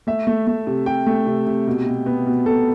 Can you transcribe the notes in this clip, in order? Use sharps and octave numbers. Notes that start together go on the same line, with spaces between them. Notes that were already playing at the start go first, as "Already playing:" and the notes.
A3 E5
A3
A3
C3
C3 G5
A3
C3
C3
B2
B2
B3
B2
B2 A4